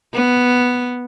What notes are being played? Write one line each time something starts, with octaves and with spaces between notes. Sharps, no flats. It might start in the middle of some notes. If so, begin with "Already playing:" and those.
B3